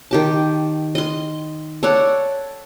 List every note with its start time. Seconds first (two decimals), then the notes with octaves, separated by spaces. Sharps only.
0.11 D#3 G4 A5
0.95 D#5 C6
1.83 A4 C#5 D5 F#5